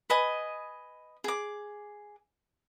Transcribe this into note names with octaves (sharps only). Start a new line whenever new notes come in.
B4 D#5 G#5
G#4 D6